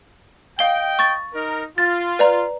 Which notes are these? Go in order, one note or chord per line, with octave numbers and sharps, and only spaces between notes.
D#5 F5 G5 G7
C#6 A6
D#4 A#4
F4 A6
B4 D5 A#5